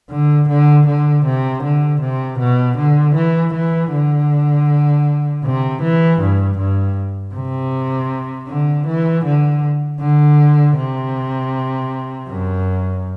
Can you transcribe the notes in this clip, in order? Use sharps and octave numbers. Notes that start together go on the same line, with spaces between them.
D3
D3
D3
C3
D3
C3
B2
D3
E3
E3
D3
C3
E3
G2
G2
C3
D3
E3
D3
D3
C3
F#2